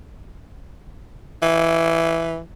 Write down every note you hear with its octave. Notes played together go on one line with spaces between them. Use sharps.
E3